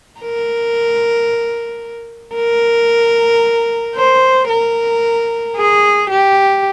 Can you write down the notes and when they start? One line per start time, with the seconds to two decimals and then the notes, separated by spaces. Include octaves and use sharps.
0.21 A#4
2.35 A#4
3.96 C5
4.49 A#4
5.56 G#4
6.10 G4